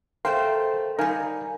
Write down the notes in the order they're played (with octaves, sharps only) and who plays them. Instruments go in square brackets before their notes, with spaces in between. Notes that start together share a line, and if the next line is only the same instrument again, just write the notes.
[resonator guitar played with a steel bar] A3 C5 G5 [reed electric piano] A#4 F5 C6
[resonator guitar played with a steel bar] G3 D#4 [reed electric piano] A#4 F5 G#5